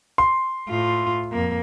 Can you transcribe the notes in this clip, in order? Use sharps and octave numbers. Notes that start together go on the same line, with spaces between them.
C6
A2 F4
F2 A#3